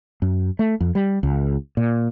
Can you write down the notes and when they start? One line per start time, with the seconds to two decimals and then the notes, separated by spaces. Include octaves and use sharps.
0.22 F#2
0.59 A3
0.80 F2
0.95 G3
1.23 C#2
1.77 A#2